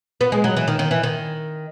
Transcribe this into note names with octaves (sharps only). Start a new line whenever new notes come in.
B3
G#3
F#3
E3
D#3
D#3
E3
D#3